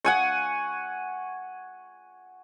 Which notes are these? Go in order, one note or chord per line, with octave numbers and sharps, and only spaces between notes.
F#5 G#5 C#6